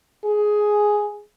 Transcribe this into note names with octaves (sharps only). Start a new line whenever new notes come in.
G#4